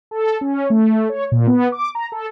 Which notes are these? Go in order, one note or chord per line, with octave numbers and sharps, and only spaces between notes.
A4
C#4
A3
C#5
A#2
B3
D6
A#5
A4